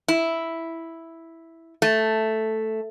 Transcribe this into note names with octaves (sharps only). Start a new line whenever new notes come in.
E4
A3